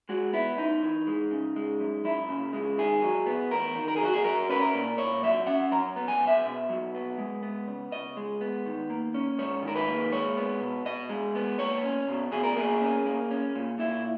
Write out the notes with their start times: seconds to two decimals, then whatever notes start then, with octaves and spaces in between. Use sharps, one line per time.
0.09 G#3 F#4
0.33 B3 E4
0.58 F#2 D#4
0.83 E3
1.07 G#3
1.31 C#3
1.56 G#3
1.80 F#2
2.05 F#2 E4
2.29 C#3
2.53 G#3
2.78 D#3 G#4
3.02 F#3
3.27 B3
3.51 E2 A#4
3.75 D#3
3.88 A#4
3.96 G#4
4.01 F#3 F#4
4.13 G#4
4.24 F#3 A#4
4.49 C#4 B4
4.61 A#4
4.74 A#2
4.98 A#2 C#5
5.23 F#3 E5
5.47 C#4 F#5
5.72 F#3 A#5
5.96 B3
6.08 G#5
6.21 B2
6.27 E5
6.46 B2
6.70 F#3
6.95 B3
7.18 G#3
7.43 B3
7.67 C#3
7.92 C#3 D#5
8.17 G#3
8.41 B3
8.66 D#3
8.90 A#3
9.14 C#4
9.38 G#2 C#5
9.63 D#3
9.68 A#4
9.76 B4
9.87 A#3
10.12 G#3 C#5
10.37 B3
10.61 B2
10.85 B2 D#5
11.10 G#3
11.35 B3
11.59 A#3 C#5
11.84 C#4
12.08 B2
12.32 B2 G#4
12.44 A#4
12.56 A#3 G#4
12.82 C#4
13.06 A#3
13.31 C#4
13.55 A#2
13.79 A#2 E4